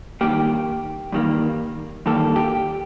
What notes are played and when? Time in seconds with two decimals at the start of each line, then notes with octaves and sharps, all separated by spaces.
0.21 G2 D#3 G3 A#3 G4
1.12 G2 D#3 G3 A#3
2.06 G2 D#3 G3 A#3 A4
2.36 G4